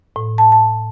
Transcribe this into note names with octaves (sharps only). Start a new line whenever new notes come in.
A2
A5
A5